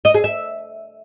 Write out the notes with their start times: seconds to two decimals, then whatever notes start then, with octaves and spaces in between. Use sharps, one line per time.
0.05 D#5
0.14 G#4
0.24 E5